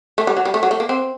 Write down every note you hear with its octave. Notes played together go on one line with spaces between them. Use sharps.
A3
G3
F#3
G3
A3
F#3
A3
A#3
C4